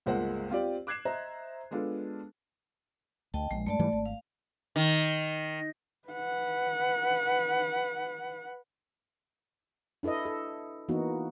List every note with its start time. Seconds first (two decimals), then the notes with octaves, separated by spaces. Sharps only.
0.06 G1 C#2 G#3 A#3 C5 F#5
0.50 C4 F4 G4 D5
0.87 D6 F#6 G#6 C7 E7
1.05 C5 D#5 E5 A#5
1.71 G#3 B3 D4 F4 A4
3.34 D2 D#5 G5 A5
3.51 A#1 G#3
3.67 G2 A3 D5 A5
3.79 G#2 E3 G3
3.92 G#1
4.06 F5
4.76 D#3
6.09 B4 F#5
10.03 D4 E4 A4 B4 D#5
10.26 A4
10.89 E3 A#3 B3 D#4 F#4